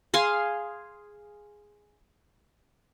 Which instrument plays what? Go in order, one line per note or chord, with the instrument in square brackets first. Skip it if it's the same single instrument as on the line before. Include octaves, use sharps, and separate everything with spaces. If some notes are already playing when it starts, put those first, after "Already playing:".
[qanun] G#4 F5 G#5 C6